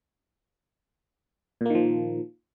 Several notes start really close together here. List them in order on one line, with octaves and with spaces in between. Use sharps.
A#2 A#3 D#3 F3